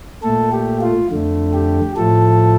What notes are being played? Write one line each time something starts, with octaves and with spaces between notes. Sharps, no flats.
A#2 A3 A4
G4
F4
F2 D3 A3
G4
A2 F3 A3 A4